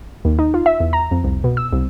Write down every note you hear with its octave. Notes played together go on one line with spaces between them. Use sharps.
D#2
D#4
F4
E5
E2
A#5
F2
C2
B2
E6
C2